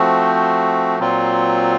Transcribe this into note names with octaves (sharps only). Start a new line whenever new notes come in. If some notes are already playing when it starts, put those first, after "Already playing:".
Already playing: F3 A3 C4 F#4
A#2 F#3 C4 F4